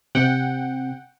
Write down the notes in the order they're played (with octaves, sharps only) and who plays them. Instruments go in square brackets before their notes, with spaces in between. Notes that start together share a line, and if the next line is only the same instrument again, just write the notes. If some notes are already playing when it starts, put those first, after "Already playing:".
[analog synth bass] C3 [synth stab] F#5 G5